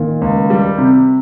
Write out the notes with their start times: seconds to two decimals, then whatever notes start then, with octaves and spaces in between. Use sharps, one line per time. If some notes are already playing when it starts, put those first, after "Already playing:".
Already playing: A#2 D#3
0.22 C#2
0.50 G3
0.78 C3